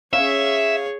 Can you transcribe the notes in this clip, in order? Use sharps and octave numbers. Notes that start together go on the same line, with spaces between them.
C#4 G#4 C#5 E5 F5